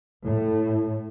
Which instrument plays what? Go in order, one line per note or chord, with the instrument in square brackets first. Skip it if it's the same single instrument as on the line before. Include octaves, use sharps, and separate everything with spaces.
[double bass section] A2